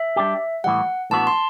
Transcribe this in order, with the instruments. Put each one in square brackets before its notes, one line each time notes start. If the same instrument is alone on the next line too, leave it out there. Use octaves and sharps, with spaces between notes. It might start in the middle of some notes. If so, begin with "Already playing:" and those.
Already playing: [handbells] E5
[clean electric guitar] G3 D4 G4
[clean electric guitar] A2 E3 G3 [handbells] F#5
[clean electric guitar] A2 E3 B3 D4 F#4 [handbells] A5
[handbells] C6